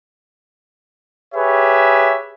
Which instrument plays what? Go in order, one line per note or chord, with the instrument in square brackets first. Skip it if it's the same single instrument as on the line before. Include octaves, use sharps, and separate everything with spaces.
[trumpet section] G4 G#4 B4 C#5 E5